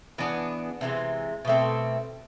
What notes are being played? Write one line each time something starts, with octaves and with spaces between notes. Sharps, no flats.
E3 B3 D4 G#4
C3 E3 G#3
B2 A3 C4